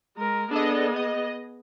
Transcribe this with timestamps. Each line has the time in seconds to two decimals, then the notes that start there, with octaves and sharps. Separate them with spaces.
0.17 G#3 A#4
0.51 B3 D4 G#4 A4 D#5
0.96 D#5